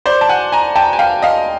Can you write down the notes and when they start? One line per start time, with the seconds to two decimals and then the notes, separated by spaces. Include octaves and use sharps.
0.06 C5 D5
0.21 A5
0.29 F#5 G#5
0.52 G#5 A#5
0.76 G5 A5
0.93 G#5
0.99 F5 G5
1.22 D#5 F5